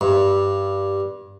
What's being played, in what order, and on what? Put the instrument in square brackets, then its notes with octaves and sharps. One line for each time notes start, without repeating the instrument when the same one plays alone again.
[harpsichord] G2